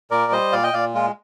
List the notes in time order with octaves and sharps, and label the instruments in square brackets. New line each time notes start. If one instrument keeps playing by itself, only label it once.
[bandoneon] A#2 A#4 D5
G3 C5 D#5
A#2 D5 F5
D#5 G5
A#2 D5 F5
G#3 F4